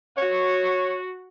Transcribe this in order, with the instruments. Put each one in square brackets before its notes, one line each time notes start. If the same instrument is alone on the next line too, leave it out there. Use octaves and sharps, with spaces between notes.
[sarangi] F#4 [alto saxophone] C#5